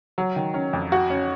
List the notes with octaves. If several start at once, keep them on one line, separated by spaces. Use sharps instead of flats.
F#3
D#3
C#4
F2
F#4
C#4